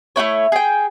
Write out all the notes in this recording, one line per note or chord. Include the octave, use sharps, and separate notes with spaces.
A3 B3 E4 C#5
G#4 G5